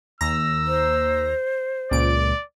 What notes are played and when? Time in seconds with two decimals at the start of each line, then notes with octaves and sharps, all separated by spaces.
0.21 D#2 A#5 E6 A#6
0.67 C5
1.91 C#2 A#2 D5 D7